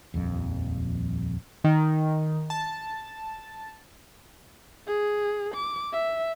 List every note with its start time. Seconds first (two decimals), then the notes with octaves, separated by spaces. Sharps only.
0.14 D#1 A#1 F2
1.64 D#3
2.50 A5
4.87 G#4
5.54 D6
5.92 E5